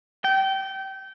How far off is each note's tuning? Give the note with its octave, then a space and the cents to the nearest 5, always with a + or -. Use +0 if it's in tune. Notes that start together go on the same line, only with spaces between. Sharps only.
G5 -25